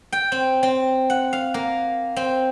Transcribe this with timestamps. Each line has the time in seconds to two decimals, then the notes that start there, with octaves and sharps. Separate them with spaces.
0.12 G5
0.32 C4
0.63 C4
1.10 F#5
1.33 F5
1.54 A#3
2.16 C4